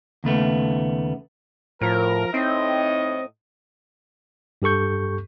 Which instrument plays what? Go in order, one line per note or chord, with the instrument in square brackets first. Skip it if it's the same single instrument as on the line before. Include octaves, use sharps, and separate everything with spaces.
[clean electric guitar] D#2 C#3 A3 B3
[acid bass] A2 [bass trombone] F3 [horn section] A#4
[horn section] A2 D#5 [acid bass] C4 [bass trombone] D#4
[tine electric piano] G2 G4 A4 C#6 G6